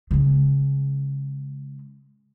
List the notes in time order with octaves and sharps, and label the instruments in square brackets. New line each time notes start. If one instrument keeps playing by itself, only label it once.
[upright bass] C#3 G#3